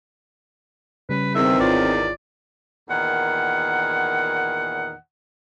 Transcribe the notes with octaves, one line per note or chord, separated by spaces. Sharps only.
C#3 G3 C#4 B4
E2 D#3 C4 E5
G#1 F4 C#5 D5
E2 A#2 D#3 F#5